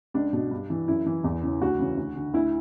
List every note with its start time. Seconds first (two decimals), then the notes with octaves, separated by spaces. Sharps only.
0.14 C#2 D4
0.33 B2
0.51 G2
0.70 E3
0.88 F#2 E4
1.06 E3
1.24 E2
1.43 C#3 E3
1.61 D2 F#4
1.79 C#3 E3
1.97 D2
2.15 D3
2.34 D2 E4